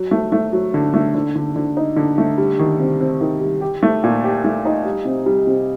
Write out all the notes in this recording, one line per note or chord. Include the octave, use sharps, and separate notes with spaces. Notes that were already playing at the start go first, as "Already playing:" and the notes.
Already playing: F#3
A3
A3
F#3
D3
A3
D3
D3
D3
D#4
D3
A3
G3
D#3
C3
C4
D#3
G3
G4
A3
A#2
G4
A3
D#4
G3
C3
G3
C3